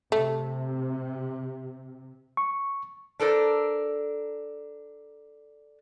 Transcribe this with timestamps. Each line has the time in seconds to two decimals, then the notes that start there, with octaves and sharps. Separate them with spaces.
0.12 C3 A3
2.37 C#6
3.20 D4 A4 A#4 C5